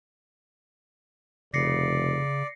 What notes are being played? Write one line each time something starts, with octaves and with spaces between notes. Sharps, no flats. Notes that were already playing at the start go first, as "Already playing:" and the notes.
F1 C#3 D5 A#6 C7 C#7